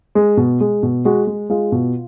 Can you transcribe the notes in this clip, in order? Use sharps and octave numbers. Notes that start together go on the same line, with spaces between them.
G#3
B2
G#3
B2
G#3 F#4
G#3
G#3 F4
B2